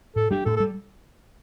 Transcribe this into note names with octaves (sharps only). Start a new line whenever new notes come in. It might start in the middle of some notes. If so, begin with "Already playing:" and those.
A2 A4
G3 D4 G4
A2 A4
A4
G3